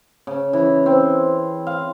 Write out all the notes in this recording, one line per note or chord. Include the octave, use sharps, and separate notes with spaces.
C#3
E3
C4
F5